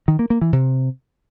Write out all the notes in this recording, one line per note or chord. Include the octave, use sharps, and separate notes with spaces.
D#3
A#3
A#3
E3
C3